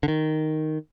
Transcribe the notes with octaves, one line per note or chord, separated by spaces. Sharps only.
D3
D#3